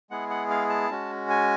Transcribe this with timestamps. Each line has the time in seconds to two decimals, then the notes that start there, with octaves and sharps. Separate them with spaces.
0.10 G#3 B3 E4 G#4 F#5
0.30 F#5
0.50 F5
0.70 A5
0.90 G#3 C#4 F#4
1.30 G#5